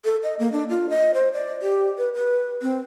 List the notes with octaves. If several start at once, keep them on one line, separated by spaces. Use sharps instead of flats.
A4
D#5
A#3
D4
F4
D#5
C5
D5
G4
B4
B4
C4